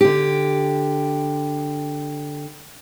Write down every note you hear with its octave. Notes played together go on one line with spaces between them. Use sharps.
D3 G4